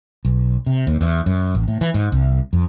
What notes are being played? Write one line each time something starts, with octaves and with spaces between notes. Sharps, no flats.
B1
C3
D#2
E2
F#2
A1
A2
E3
G#2
C2
F2